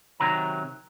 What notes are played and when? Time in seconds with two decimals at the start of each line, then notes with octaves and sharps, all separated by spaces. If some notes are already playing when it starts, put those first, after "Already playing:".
0.20 C3 D#3 F#3 A#5